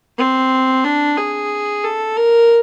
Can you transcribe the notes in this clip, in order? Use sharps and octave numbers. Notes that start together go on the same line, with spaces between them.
C4
D4
G#4
A4
A#4